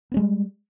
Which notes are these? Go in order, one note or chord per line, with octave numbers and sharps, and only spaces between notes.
G3 G#3 B3 C#4